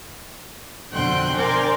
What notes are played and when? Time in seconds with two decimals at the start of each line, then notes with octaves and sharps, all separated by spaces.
0.93 F2 B2 D3 G5 C6 F#6
1.37 A#4 C5 D5 G5 G#5